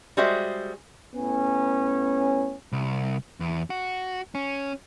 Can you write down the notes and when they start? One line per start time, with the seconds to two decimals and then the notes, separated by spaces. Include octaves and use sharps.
0.17 G3 G#3 F#4 G#4 C5 E5
1.15 A2 B3 C#4
2.72 C2
3.40 E2
3.70 F#4
4.35 C#4